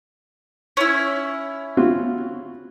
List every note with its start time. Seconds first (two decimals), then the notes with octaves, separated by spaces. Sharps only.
0.77 C#4 E4
1.77 C4 F4 F#4